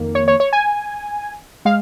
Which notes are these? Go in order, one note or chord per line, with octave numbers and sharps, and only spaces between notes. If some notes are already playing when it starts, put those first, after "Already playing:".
Already playing: F2 D#3 A#3
C#5
C#5
C#5
G#5
G#3 F5